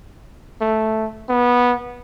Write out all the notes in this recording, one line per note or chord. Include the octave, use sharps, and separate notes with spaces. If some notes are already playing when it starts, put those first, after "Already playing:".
A3
B3